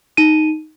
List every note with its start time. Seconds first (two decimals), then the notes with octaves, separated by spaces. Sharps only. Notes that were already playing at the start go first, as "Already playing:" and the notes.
0.17 D#4 D#7